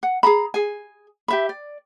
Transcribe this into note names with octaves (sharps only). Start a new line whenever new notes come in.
F#5
G#4 A4 A#5 B5
G#4 G#5
G4 E5 B5
D5